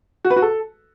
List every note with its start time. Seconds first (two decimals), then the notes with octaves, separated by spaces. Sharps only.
0.25 F#4
0.30 B4
0.36 F#4
0.42 A4